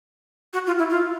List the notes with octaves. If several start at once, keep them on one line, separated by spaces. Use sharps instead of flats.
F#4
F4
E4
F4